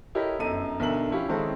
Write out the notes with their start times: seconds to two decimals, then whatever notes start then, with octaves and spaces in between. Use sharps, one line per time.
0.15 E4 G4 A4 A#4 C#5 D#5
0.39 G1 F#2 D#4 A4 D#7
0.79 B1 D3 A#4 E5 F#7
1.11 F3 C#4 E4 F4 G4
1.29 D#3 G#3 C4 C#4 E4 A4